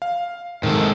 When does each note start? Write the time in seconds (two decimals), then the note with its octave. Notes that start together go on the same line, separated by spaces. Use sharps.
0.02 F5
0.63 G#2 C3 D#3 A4